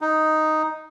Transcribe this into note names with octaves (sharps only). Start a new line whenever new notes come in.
D#4